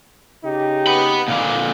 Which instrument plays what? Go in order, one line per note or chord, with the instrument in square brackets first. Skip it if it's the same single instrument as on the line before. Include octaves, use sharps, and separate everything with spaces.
[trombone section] C#3 D#4 G4
[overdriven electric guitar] F#5 B5
A#2 D3